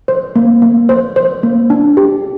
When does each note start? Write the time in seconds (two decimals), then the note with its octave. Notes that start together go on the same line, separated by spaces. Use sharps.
0.08 C5
0.36 A#3
0.62 A#3
0.89 C5
1.16 C5
1.43 A#3
1.70 D4
1.97 G4